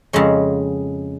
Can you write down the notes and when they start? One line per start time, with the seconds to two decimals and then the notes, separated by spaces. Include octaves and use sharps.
0.13 F2 C#3 G#3 C#4